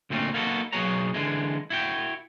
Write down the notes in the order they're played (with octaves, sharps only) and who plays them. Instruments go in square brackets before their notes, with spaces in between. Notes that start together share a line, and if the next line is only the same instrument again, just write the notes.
[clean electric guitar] D2 A#2 A3 C4 C#4
A#3 B3 D#4 F#4 G#4 A4
B1 F#3 B3 G#4 C#5 A#5
D3 E3 G#3
E4 F#4 G5